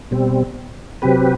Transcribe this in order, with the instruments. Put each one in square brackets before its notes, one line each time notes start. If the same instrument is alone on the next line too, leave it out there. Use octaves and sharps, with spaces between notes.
[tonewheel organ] B2 G3 C4
C3 F#3 C4 G4 B4